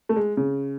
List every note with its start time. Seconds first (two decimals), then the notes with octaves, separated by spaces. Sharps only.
0.09 A3
0.16 G#3
0.37 C#3